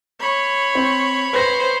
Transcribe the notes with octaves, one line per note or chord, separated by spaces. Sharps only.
C#5 B5
C4
B4 C5 C6 A#6